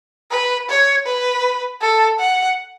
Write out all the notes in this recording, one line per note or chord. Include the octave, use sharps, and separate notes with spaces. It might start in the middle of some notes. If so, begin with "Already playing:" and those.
B4
C#5
B4
A4
F#5